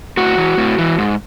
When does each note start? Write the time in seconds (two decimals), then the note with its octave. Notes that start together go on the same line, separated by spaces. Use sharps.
0.17 A2 F#4
0.37 E3
0.58 A2
0.78 E3
0.98 G#2